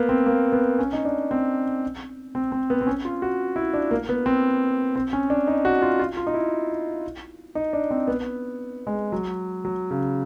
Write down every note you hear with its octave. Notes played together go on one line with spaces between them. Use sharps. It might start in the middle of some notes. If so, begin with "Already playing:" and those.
Already playing: A#3 B3
C4
A#3
B3
C#4
D#4
D4
C4
C4
C4
B3
C4
C#4
F4
F#4
E4
D4
A#3
B3
C4
C4
C#4
D4
D#4
F#4
F4
F4
F4
D#4
E4
D#4
D4
C4
B3
G#3
F#3
F#3
C#3